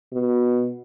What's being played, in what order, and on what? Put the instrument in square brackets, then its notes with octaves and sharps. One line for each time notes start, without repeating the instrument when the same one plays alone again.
[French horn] B2